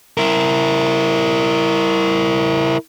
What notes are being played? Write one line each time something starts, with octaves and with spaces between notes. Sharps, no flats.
E4 A#4